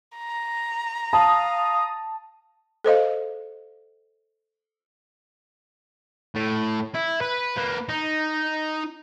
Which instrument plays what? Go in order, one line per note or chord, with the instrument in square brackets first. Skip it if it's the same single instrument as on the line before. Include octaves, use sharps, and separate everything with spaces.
[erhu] A#5
[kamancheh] F5 [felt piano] A5 [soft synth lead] D#6
[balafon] A4 C5 D#5 F5
[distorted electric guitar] A2
E4
B4
A#3 B4
D#4